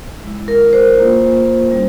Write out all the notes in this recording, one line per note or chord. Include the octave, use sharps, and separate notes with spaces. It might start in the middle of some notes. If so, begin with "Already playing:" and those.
G#3 E4
A#4
C5
A#3 F4
G3 C#4 E4